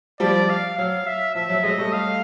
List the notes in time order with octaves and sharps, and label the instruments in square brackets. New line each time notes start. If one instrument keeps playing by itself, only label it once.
[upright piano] F3 G3 [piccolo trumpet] D5
[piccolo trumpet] F5
[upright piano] F#3 [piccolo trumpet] F5
[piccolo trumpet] E5
[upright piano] F3 [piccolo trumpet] E5
[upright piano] F#3
[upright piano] F#3 G#3 [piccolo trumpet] D#5
[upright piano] G3 A3
[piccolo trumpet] F5